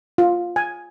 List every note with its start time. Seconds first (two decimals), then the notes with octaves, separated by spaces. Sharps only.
0.18 F4
0.56 G#5